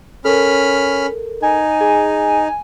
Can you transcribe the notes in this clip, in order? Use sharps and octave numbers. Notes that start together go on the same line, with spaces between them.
C#4 A4 A#4 B5 F6
D#4 G#5
G#4 G#5